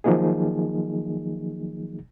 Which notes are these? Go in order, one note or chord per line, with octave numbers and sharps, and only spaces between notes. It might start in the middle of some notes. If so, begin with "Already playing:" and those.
D#3 F3 F#3 A#3 D#4 G#4